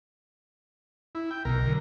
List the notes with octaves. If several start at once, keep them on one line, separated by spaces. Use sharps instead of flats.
E4
G5
B1 B2 A#4
D3 E3 F#3